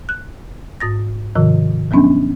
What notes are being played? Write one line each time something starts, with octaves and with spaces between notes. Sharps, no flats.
F#6
G#2 D#6 A6 A#6
G#2 C3 D#3 F3
F3 F#3 B3 C#4 D4